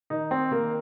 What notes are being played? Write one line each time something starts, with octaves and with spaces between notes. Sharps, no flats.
D#3 D#4
C4
D#3 A#3